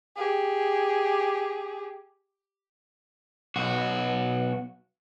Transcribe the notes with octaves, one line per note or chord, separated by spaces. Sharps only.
G4 G#4
B1 F#4